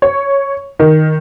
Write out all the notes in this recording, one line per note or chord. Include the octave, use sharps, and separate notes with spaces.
C#5
D#3